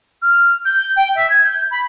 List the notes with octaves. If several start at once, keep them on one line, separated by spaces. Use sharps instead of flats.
F6
G6
G5
E5
G#6
G6
B5